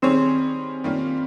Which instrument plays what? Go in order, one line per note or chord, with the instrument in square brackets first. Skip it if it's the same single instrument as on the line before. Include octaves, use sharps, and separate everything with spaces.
[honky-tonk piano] D#3 G3 C#4 G#4 C#5 [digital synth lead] C4
[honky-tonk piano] D#3 G3 A#3 C#4 F4